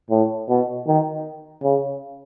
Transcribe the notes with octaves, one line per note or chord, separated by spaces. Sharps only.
A2
B2
D#3
C#3